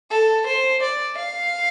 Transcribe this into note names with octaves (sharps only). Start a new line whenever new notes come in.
A4
C5
D5
F5